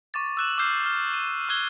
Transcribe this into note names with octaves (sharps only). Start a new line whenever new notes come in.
C#6 D6 A6
E6 F#6 E7
D6 E6 F6 G6 C7
F6
D#7
C#6 F6 F#6 G#6 G7